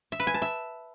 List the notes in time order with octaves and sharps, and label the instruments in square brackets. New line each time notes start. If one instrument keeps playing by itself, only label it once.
[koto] E5
B4
G#5
A5
E5